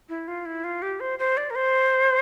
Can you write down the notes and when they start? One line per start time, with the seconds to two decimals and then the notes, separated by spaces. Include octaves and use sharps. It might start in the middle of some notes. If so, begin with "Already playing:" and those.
0.09 E4
0.28 F4
0.46 E4
0.64 F4
0.82 G4
1.00 C5
1.19 C5
1.37 D5
1.50 A#4
1.55 C5